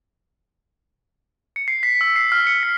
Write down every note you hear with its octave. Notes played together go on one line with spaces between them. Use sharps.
C#7
C7
B6
E6
C7
F6
C#7
B6